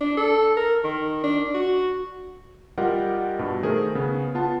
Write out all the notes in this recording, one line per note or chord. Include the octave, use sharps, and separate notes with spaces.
D4
A4
A#4
D#3
D4
F#4
G3 F4 G4 A#4 D#5 F#5
G2 B2
D#3 A3 G#4 A#4 C5
C#3 B3
B3 F4 F#5 A5